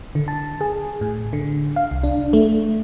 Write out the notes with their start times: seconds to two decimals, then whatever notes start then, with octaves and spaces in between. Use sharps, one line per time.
0.15 D3
0.28 A5
0.61 G#4
1.01 A2
1.33 D3
1.76 F5
1.91 C2
2.04 D4
2.33 A3